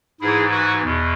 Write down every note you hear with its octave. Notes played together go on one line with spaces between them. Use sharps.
G#2 E3 E4 G#4
F#4 B4
E2 B2